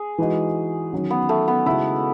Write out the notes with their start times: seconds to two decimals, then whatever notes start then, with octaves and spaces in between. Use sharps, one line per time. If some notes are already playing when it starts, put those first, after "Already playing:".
Already playing: G#4
0.18 E3 G#3 D#4 F#4
0.93 D#3 F#3 C#4 F#4
1.10 B3
1.29 A3
1.48 B3
1.66 C#3 G#3 D#4 E4 F#4